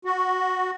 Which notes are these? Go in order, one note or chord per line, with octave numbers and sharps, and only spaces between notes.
F#4